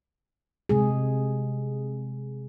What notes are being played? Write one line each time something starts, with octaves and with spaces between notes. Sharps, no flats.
C3 G#3 G#4